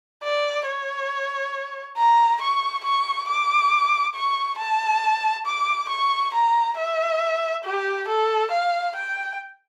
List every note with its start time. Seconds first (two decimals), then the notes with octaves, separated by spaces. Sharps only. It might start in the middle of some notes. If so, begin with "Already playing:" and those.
0.23 D5
0.66 C#5
1.97 A#5
2.41 C#6
2.84 C#6
3.28 D6
4.15 C#6
4.58 A5
5.46 D6
5.89 C#6
6.34 A#5
6.77 E5
7.64 G4
8.08 A4
8.51 F5
8.96 G5